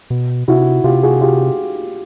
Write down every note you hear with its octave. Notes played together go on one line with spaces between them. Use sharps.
B2
C3 E4 F#4
C3 F4 G4
F#4 G#4
F4 G4